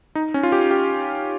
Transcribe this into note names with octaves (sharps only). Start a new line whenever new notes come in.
D#4
C#4
F4
G4
G4